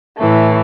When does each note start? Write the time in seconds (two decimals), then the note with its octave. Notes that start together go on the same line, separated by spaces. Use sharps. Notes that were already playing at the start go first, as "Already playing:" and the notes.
0.17 A2 E3 A3